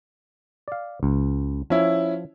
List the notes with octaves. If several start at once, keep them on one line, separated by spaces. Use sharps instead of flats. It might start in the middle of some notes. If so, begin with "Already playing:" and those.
D5 F5
C#2
F3 C#4 E4